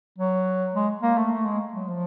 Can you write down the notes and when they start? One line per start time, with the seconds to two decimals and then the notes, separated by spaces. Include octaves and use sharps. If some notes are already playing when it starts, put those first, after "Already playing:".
0.18 F#3
0.75 G#3
1.02 A#3
1.18 A3
1.31 A3
1.45 G#3
1.74 F#3
1.88 F3